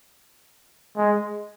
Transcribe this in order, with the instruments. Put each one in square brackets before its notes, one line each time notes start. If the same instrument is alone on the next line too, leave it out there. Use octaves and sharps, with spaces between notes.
[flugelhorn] G#3